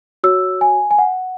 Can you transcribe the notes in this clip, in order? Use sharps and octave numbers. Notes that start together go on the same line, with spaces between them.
F#4 C#5 E6
G#5
G#5
F#5